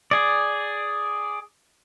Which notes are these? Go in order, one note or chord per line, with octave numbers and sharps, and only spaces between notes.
G#4 D5